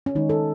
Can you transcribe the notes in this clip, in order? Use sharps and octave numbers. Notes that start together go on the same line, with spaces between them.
C#4
D#3 G#3 D#4
A4